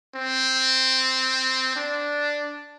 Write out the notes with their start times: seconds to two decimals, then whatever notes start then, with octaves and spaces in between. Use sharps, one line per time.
0.15 C4
1.76 D4